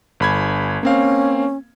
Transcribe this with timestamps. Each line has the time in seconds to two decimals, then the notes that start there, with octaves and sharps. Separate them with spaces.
0.20 G1 B5 G#6
0.83 A#3 C4 C#4 F5